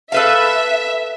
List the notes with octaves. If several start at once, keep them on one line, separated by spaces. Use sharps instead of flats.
A4 B4 E5 F5